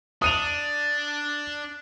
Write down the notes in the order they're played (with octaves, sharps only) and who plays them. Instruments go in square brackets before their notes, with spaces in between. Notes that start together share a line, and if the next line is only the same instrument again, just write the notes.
[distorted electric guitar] D4 [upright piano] D#6 D#7 F7